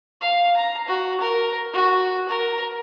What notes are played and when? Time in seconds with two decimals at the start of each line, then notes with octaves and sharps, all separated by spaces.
0.21 F5
0.57 A#5
0.88 F#4
1.20 A#4
1.73 F#4
2.28 A#4